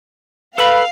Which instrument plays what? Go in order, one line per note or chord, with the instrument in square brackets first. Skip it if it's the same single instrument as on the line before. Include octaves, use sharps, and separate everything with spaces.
[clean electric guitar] A4 B5 [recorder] B4 [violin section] F5